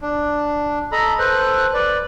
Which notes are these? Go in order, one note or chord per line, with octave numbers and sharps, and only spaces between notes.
D4
A4 D#5 A#5 B5
A4 B4 C5 F#6
B4 D5